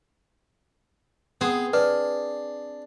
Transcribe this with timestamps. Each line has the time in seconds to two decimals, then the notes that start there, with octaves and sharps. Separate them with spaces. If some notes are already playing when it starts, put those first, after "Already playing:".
1.41 B3 C4 G#4 C5
1.73 D4 B4